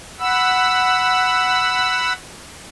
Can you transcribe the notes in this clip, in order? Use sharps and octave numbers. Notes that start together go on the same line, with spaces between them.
F#5 B5 E6